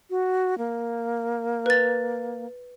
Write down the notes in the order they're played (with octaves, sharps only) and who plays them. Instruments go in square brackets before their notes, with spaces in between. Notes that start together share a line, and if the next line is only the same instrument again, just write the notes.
[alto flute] F#4
A#3
[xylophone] B4 A6